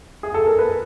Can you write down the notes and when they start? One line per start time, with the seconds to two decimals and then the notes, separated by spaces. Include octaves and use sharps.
0.23 G#4
0.34 A4
0.47 A#4
0.59 B4